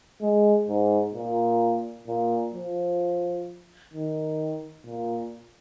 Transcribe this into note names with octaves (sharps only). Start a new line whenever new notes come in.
G#3
G#2
A#2
A#2
F3
D#3
A#2